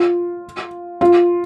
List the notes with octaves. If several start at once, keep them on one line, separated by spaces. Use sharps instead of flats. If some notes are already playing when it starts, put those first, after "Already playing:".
Already playing: F4
F4